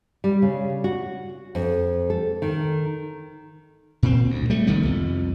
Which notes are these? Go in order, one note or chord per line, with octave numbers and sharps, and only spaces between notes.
G3
C#3
F#4
F2
A4
D#3
A#2 C4
D2
G3 A3
C2 D#3 G3 B3
C2 F2